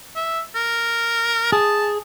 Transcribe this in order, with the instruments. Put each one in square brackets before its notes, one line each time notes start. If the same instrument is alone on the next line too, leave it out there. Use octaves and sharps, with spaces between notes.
[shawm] E5
A#4
[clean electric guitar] G#4 [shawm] A5